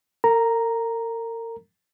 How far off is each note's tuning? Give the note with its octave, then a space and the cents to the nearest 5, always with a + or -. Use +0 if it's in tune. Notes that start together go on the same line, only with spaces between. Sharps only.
A#4 -40 A#5 +0